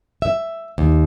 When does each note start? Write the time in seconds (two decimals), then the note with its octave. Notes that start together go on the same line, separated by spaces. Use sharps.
0.22 E5
0.78 D#2